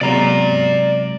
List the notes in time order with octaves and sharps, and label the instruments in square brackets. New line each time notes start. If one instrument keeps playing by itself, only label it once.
[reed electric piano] C3 F#3 G#3 [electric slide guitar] D5 A#5